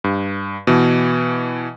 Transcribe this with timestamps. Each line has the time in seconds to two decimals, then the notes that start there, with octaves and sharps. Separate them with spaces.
0.04 G2
0.67 B2 E3